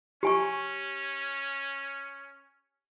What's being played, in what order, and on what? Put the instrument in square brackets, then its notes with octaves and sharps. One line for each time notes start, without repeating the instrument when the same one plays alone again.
[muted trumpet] C#4 [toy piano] G4 G#5 C#6